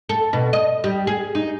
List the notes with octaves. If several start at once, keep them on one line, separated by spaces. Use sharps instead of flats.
A4
B2
D#5
G3
G#4
D#4